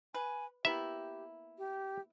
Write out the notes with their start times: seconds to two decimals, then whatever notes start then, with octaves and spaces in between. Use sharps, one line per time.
0.14 B4 G#5
0.65 A#3 B3 E4 G4 E5
1.58 G4